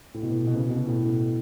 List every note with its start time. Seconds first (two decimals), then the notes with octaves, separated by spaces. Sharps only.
0.14 A2
0.22 B2
0.47 B2
0.55 C#3
0.70 B2
0.87 A2